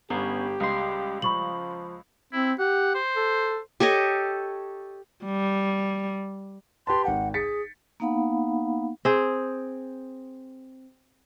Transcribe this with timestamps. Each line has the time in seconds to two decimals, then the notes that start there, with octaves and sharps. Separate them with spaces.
0.10 G1 B3 C#4 G4
0.60 C#2 G3 C6
1.22 F3 B5 C#6 F#7
2.33 C4 E4
2.59 G4 F#5
2.95 C5
3.16 A4
3.80 G4 A4 C#5 D#5
5.25 G3
6.87 G4 B4 A5 C6
7.05 G#1 F#5 G5
7.34 G#4 A6 B6 C#7
8.00 A#3 B3 D#4 F5 F#5 B5
9.05 C4 G#4